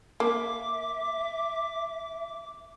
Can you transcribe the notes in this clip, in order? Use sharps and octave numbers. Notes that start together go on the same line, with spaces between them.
A#3 E5 D6